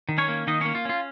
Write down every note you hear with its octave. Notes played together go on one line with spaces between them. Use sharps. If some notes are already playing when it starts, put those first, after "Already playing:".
D#3
C#4 C#5
A#3
D#3 D#4 D#5
A#3 C#4 C#5
F4
C#4 F4